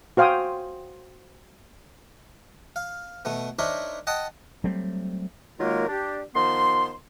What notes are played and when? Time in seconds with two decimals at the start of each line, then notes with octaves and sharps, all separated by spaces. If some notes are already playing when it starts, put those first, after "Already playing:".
0.17 F#4 C5 F5 G5 G#5 D#6
2.76 F5
3.25 B2 A3 B3
3.59 D4 D#4 A#4 C5 C#5 E5
4.07 D#5 F#5 G5 A5 D#6
4.64 F#3 G3 A3 C4
5.58 D#3 F#3 G#3 A#3 F4 A#4
5.88 D4 G4
6.35 D#3 F3 B3 C6